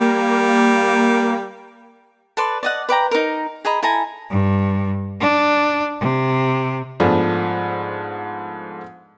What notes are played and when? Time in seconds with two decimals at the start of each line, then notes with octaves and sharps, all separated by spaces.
0.01 G3 A#3
2.37 A4 B4 D5 C6
2.63 D5 D#5 F#5
2.89 B4 D5 G5 A#5
3.11 D#4 A#4
3.65 G#4 D#5 A#5 B5
3.82 E4 A4 G#5 A#5
4.31 G2
5.20 D4
6.01 C3
7.00 G#2 F3 A3 B3 D4